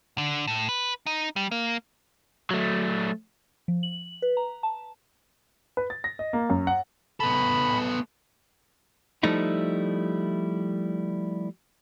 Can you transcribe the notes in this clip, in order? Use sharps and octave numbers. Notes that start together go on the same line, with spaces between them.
D3
A2
B4
D#4
G3
A#3
F#3 A3
F3
F#7
B4
A#5
A5
B4
A6
A#6
D#5
A#3
F#2
F#5
B3 A4 B5
F3 G3 A3 D#4 E4